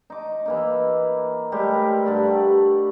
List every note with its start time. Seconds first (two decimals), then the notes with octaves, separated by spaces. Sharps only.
0.10 D#4 D6
0.46 E3 A#3 D#4
1.52 A2 G3 G#3 G4
1.74 A#4
2.05 G2 D3 D5 B5
2.26 A3